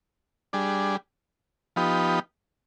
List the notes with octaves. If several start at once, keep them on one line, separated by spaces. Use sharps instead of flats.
G3 D4 G#4
F3 B3 D#4 G4